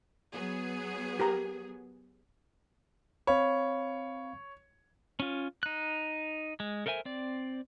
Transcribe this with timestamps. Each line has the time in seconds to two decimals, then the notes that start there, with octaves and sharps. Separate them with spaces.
0.34 F#3 B3 G#4
1.20 G4 A#4 A#5
3.27 C4 C#5 F5 B5
5.20 C#4 F4
5.63 D#4 F#6
6.60 G#3
6.86 A4 A#4 C5 E5 G#5
7.05 C4 D5